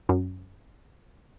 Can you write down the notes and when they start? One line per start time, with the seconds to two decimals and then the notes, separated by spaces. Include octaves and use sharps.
0.09 F#2